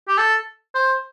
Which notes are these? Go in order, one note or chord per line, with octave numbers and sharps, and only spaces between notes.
G4
A4
C5